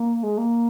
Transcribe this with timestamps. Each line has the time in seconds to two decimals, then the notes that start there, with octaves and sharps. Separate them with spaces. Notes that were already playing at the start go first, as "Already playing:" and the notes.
Already playing: A#3
0.23 G#3
0.37 A#3